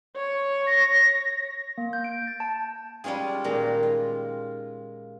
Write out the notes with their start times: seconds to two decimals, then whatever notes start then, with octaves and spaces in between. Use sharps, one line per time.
0.16 C#5
0.67 A#6
1.78 A#3
1.93 G6
2.04 D7
2.27 A6
2.40 A5
3.04 G3 G#3 C#4 F4 G#4
3.44 A#2 D#3 G#3 A#5
3.83 F4